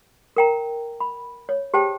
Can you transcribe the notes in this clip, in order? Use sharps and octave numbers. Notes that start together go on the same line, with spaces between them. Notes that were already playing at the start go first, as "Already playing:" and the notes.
A#4 G5 A#5
B5
C#5
G4 G#4 C5 G5 A5